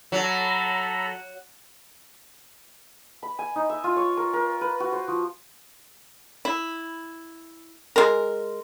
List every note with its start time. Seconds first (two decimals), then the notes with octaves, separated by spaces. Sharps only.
0.12 F#3 A4 A#5 B5
3.23 B5
3.39 G#5
3.56 D#4
3.70 E5
3.84 F4
3.96 C#5
4.17 A#4
4.33 A#4
4.61 B4
4.80 F#4
4.93 C5
5.08 F3
6.45 E4
7.96 G#3 A#4